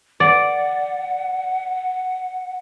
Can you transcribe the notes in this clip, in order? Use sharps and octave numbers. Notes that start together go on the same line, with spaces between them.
D5 F#5